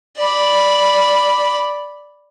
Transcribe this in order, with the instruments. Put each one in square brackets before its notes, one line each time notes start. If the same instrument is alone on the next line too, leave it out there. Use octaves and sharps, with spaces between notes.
[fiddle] D5 B5